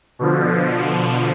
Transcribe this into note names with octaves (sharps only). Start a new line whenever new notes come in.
B2 D3 F3